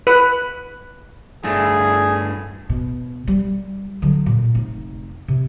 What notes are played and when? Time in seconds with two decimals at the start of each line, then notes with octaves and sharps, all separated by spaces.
0.07 B4
1.44 G2 A3 G#4
2.69 B2
3.27 G3
4.02 D3 F#3
4.26 A#2
4.55 F1 D#4
5.28 C3